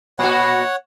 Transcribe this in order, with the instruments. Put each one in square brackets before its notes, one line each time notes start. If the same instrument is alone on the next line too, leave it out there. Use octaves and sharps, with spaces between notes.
[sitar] A#2 F#4 [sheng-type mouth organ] C#5 F#5